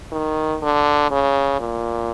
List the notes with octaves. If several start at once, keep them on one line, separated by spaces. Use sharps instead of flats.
D#3
D3
C#3
A#2